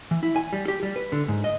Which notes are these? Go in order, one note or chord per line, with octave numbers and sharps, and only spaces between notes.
E3
E4
G#5
G3
G4
G3
B4
D3
G#2
D#5